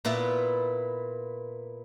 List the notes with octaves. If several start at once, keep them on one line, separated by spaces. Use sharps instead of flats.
A#2 B3 E4 F4